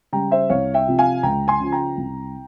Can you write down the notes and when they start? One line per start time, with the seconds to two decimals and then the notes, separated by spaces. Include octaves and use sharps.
0.12 C#3 G3 G5 A#5
0.31 C5 E5
0.50 C2 C#5 F5
0.74 E5 G5
0.87 C3 F3
0.99 F5 G#5
1.23 C#2 G5 A#5
1.48 G#5 C6
1.60 C#3 F3
1.72 G5 A#5
1.98 C2